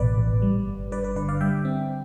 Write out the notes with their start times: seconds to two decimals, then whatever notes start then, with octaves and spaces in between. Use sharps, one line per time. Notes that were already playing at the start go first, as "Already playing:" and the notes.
Already playing: A1 B2 B4 D5
0.18 A1
0.42 G3
0.68 G1
0.91 G2 B4 D5
1.04 B4
1.16 D3 B4 D5
1.29 D5 F5
1.41 G3 E5 G5
1.65 C4